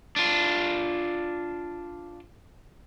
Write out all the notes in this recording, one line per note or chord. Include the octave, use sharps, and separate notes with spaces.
D4 F4